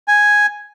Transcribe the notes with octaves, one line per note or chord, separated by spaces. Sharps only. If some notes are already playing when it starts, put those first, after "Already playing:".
G#5